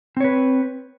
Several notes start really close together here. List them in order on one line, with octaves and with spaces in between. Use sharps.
C4 C#5 B4